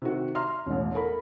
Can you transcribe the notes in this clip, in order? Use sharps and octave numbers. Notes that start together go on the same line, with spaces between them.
C3 D#3 F#4
E5 A#5 C6 F6
E1 A1
A4 A#4 B5